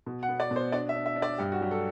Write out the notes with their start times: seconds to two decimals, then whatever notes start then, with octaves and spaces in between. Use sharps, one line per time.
0.06 B2
0.23 F#5
0.29 B3
0.40 D5
0.51 B2
0.56 C5
0.72 D4 D5
0.89 E5
0.95 D4
1.06 E5
1.16 D4
1.22 D5
1.38 G2 G4
1.52 F#4
1.61 F#3 G4
1.71 A4